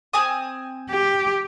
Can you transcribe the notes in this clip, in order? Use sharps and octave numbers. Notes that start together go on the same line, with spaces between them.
C4 G#5 D#6
G4